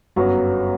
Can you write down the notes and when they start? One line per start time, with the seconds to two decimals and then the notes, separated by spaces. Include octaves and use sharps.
0.16 G1 F#2 F#3 B3 F#4